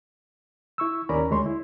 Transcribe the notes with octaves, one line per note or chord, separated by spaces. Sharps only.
E4 C#6 E6
D#2 C#4 A#4 D5 A#5 B5
D2 G#3 C#5 C6
E4